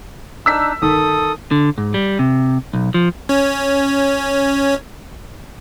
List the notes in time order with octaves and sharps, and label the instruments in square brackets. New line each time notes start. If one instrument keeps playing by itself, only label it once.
[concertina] D4 D#4 [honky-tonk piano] E6 B6
[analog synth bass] G1 [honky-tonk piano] D#3 [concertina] A4 D#6
[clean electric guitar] D3
G#2
G3
C3
B1
F3
[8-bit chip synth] C#4 C#5